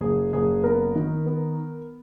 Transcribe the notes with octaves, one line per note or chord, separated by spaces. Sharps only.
F#1 G#4
F#1 G#4
B3 A#4
D#3
B3